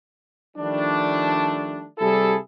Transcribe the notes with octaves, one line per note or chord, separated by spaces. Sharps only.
D#3 F3 G3 A3 D4
C3 G3 E4 G#4 A4